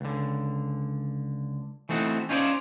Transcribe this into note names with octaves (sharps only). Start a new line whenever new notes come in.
C#2 D3
E3 A3 C4 D#4 F#4
C#4 D#4 F4 G#4 C5 D5